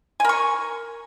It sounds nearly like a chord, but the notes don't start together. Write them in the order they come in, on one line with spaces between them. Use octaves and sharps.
G#5 A#4 C#6